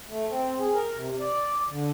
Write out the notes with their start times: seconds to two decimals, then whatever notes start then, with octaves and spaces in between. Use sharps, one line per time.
0.08 A3
0.29 C4
0.59 G#4
0.73 A#4
0.94 C3
1.20 D5
1.70 D3